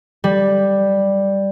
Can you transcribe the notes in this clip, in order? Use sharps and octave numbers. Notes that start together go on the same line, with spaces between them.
G3